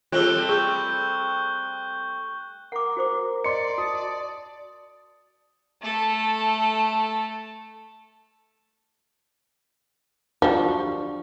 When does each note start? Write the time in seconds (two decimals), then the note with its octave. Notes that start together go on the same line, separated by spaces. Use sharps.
0.12 G3 A3 C4 F4 G#4 F#6 G7
0.49 G#4 C#6 G6
2.72 A#4 F#5 D6
2.97 F#4 C5 D6
3.44 D5 D#5 C6 C#7
3.78 F#4 A5 D#6
5.82 A3 A4
10.42 F3 G3 D4 F#4